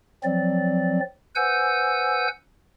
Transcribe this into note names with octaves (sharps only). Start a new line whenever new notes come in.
F3 F#3 C4 D5
B4 C5 F#5 G#5 E6 G6